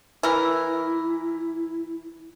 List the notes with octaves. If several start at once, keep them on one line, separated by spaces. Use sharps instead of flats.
E3 E4 A#4